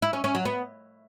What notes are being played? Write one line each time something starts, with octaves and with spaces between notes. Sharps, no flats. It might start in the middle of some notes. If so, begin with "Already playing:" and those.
E4
C#4
C#4
F#3
B3